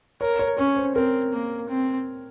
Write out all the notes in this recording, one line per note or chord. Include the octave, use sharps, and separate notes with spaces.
A#4 C#5
C#5
C#4 C#5
C5
C4 A#4
A#3
C4